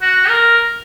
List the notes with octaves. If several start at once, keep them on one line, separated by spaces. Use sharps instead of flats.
F#4
A#4